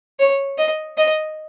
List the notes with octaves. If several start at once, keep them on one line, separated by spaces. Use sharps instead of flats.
C#5
D#5
D#5